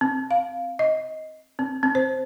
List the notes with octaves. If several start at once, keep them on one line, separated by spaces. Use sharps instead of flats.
C4
F5
D#5
C4
C4
C5